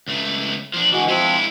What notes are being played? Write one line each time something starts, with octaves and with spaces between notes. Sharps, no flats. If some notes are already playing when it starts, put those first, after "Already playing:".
C#2 A3
F3 D4
D3 E3 G#3 F#4
F3 G#3 C4 E4